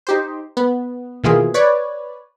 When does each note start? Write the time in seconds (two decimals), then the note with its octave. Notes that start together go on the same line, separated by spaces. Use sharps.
0.07 D#4 G4 C5
0.57 B3
1.24 B2 D#3 E3 A#3 F4 G#4
1.54 B4 C#5 D5